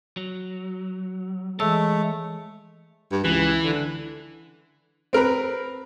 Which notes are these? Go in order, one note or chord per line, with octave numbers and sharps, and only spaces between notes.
F#3
E3 G#3 A3 C#5 A5 E6
G2
C#2 E3
D3
C4 A#4 B4 B5